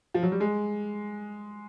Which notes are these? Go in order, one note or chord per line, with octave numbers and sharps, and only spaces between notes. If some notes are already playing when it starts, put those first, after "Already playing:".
F3
F#3
G3
G#3